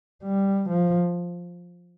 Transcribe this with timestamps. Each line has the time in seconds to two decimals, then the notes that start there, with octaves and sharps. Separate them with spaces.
0.24 G3
0.69 F3